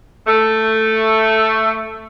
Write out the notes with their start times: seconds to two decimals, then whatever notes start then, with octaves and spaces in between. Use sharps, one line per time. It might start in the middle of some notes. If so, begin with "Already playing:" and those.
0.27 A3 A4